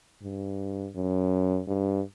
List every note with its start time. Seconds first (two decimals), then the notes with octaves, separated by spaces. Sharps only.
0.22 G2
0.95 F#2
1.68 G2